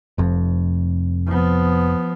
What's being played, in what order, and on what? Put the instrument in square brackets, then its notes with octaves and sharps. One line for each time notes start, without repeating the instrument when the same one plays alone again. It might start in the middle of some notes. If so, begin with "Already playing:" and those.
[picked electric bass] F1 F2
[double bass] F3 B3